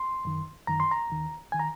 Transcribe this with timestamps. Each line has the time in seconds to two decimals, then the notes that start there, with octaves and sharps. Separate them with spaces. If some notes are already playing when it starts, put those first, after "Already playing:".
Already playing: C6
0.25 F#2 D#3
0.67 F#2 D#3 A#5
0.80 C6
0.91 A#5
1.10 D#2 D#3
1.52 D#3 G#5
1.60 A#5